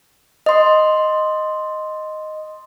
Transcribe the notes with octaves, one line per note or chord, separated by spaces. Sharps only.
D#5 C6